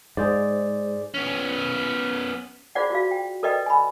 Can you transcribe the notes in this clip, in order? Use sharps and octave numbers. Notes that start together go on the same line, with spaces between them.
G#2 G#4 C5 D5
B3 C#4
F4 G#4 C5 D5 F5 F#5
F4 F#4 D5 F5
G5
A4 B4 D5 D#5 G5
G#5 B5